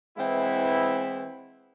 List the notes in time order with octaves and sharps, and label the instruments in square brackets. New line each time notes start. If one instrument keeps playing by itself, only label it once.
[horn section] E3 G#3 B3 C4 E4